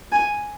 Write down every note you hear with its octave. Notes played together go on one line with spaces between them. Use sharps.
G#5